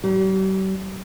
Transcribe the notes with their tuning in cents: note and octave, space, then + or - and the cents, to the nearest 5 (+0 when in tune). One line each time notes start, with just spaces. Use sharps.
G3 -45